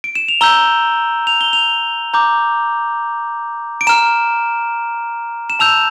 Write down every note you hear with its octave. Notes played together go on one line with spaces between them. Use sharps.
D7
E7
F7
A#5 E6 G6 G7
F7
G7
F7
A#5 D6 G6
D7
A#5 F6 E7
E7
A5 E6 G6 F7